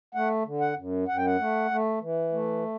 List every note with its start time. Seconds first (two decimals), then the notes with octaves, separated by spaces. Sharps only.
0.15 A3 F#5
0.45 D3
0.61 F#5
0.76 F#2
1.08 F#2 F#5
1.17 G5
1.26 F#5
1.39 A3
1.71 A3
2.01 E3
2.33 A3